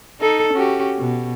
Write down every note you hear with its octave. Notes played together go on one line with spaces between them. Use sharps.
D#4 A4
C#4 F#4 G4
B2